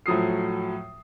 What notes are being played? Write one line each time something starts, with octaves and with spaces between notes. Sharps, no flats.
A2 F3 F#3 D#6 C7